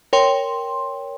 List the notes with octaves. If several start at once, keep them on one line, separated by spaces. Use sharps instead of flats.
A#4 C#5 G5 C6